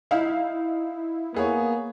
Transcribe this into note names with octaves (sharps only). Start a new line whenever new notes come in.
D#4 E4 F5
A#3 B3 G#4 C#5